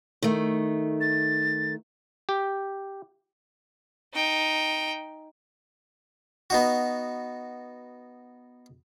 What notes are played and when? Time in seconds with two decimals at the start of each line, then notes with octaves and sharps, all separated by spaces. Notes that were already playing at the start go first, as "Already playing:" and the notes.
0.22 D#3 A3
1.01 A6
2.29 G4
4.14 D#4 G5
6.50 B3 D#4 F#4